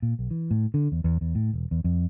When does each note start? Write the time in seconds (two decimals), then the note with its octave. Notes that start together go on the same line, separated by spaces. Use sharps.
0.02 A#2
0.19 B1
0.31 E3
0.51 A2
0.74 D3
0.92 E2
1.04 E2
1.21 E2
1.35 A2
1.53 E1
1.71 E2
1.84 F2